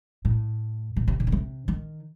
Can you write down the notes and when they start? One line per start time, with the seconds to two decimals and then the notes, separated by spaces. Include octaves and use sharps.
0.25 A2
0.96 B2
1.08 C3
1.20 C3
1.27 D#3
1.32 C3
1.68 D#3